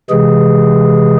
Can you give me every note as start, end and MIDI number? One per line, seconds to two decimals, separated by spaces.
0.10 1.17 48
0.10 1.17 52
0.10 1.17 56
0.10 1.17 68